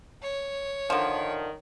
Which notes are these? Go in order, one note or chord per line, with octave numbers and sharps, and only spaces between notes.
C#5
D3 D#3 F3